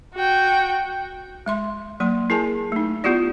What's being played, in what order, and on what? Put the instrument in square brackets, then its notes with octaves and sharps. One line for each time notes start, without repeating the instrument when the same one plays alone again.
[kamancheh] F#4 G5
[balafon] G#3 E5 C6
F#3 A#3 C6
E4 G#4 A#4 G#5 A5
A3 D#4
B3 E4 F4 G4 D5